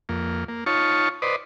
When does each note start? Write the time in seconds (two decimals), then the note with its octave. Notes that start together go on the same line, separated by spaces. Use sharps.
0.09 F2 A#3
0.48 A#3
0.66 D#4 F4 C#5 A5 C#6
1.22 B4 C5 D5 D#5